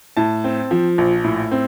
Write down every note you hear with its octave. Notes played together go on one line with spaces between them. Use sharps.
A2 A5
C4
F3
A#1
A2
C4